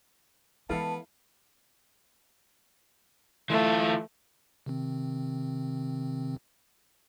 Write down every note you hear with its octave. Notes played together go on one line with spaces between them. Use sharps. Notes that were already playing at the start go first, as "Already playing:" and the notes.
E3 G#3 B3 E4 A4 F5 A5
E3 A3 F4
C3 D#3 C4